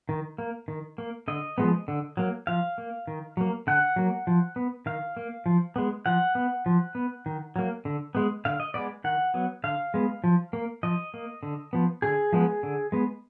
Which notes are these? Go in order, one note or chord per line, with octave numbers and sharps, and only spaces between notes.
D#3
A#3
D#3
A#3
D3 D#5
F3 G#3 B3
D3
F#3 A#3
F3 F5
A#3
D#3
F#3 A#3
D3 F#5
F#3 A#3
F3
B3
D#3 F5
A#3
F3
G#3 B3
F3 F#5
B3
F3
B3
D#3
F#3 A#3
D3
G#3 B3
D3 F5
D#5
G#3 B3 D5
D#3 F#5
F#3 B3
D3 F5
G#3 B3
F3
A#3
F3 D#5
A#3
D3
F3 B3
D3 G#4
F3 G#3 B3
D3
G#3 B3